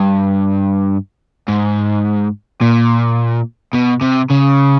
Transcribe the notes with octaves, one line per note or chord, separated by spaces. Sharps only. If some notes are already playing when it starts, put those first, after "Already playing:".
Already playing: G2
G#2
A#2
B2
C3
C#3